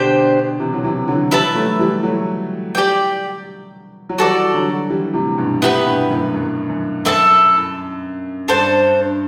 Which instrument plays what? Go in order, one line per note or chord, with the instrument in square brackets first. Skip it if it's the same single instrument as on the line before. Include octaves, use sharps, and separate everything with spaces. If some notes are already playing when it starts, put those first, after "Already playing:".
Already playing: [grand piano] B2 D3 [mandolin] D4 G4 C5 G5
[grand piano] C3 E3
F#3
C3 E3
D3 F#3
[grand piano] E3 G3 [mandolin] E4 B4 E5 A5
[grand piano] F#3 A3
E3 G3
F#3 A3
[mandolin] G4 D5 G5
[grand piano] F#3
[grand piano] E3 G3 [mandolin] F#4 A4 D5
[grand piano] D3 F#3
E3 G3
A2 C3
G2 B2
[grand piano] A2 C3 [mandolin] B3 E4 G4 B4
[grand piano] G2 B2
F#2 A2
F#2
F#2
[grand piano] F#2 [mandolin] E4 A4 E5 A5
[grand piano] G2 [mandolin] D4 A4 C5